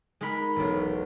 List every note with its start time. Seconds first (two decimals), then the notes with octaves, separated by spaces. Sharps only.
0.21 G#3 D#4 A#4 B5
0.56 E1 B1